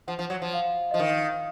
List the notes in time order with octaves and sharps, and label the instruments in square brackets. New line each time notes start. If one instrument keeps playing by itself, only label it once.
[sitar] F3 [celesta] F#5
[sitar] F3
[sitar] F#3 [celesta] F#5
[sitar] F3
[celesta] F5
[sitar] F3 [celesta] D#5
[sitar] D#3 [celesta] F5